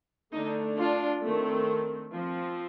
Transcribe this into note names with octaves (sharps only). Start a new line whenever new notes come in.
D3 A3 D4 D#4
D4 F4
D#3 A3 C4
F3 C4